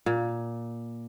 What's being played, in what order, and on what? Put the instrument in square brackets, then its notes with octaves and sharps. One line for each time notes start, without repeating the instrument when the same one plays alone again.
[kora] A#2